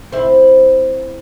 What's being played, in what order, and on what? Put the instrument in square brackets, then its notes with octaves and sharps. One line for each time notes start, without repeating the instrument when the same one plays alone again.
[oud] C4 E4